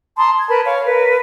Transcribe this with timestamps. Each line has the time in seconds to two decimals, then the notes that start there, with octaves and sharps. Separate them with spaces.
0.17 A5 A#5 C6 D#6
0.37 G#6
0.49 A#4 B4 A5 B5
0.64 C#5 F5
0.86 A#4 B4